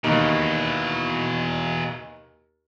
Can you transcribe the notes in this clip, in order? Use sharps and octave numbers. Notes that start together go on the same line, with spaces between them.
D#2 B2 E3